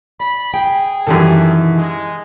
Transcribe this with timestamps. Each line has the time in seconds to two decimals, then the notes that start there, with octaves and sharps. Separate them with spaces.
0.20 D5 B5
0.54 G#4 G5
1.07 F#2 B2 D#3 E3 G3 A4
1.76 G#3